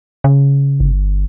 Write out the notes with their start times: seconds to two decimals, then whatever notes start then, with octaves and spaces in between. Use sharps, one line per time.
0.24 C#3
0.80 G1